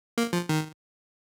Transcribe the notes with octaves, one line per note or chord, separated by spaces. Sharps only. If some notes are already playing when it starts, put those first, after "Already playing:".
A#3
F3
D#3